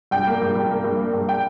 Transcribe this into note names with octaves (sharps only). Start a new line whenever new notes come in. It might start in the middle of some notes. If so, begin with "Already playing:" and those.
G2 G5
A#3
G2
G2
A#3
G2
A#3
G2
G5